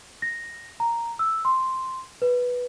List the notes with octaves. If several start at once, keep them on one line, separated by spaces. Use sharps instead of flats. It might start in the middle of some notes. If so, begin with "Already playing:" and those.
A#6
A#5
E6
C6
B4